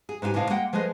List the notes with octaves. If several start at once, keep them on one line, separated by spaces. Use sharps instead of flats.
G#4
G#2 D4 E4 G4 G#5
A2 C3 D4 E4 D#5 F5
G#3 A#3 F#5 G5
F3 G#3 A3 B4 D#5